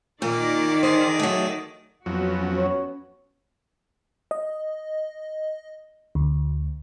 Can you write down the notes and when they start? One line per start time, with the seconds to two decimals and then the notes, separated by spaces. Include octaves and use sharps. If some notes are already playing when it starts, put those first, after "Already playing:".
0.22 A#2 D#3 A#3 D5
0.83 G#4 C5
1.20 F#3 A3
2.06 F2 F#3 B3 C#4 F#4
2.56 C#5
4.31 D#5
6.15 D2